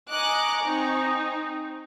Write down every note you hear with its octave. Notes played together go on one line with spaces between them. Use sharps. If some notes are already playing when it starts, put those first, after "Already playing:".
D#5 G#5 A#5 C#6 D6 F#6
C4 D#4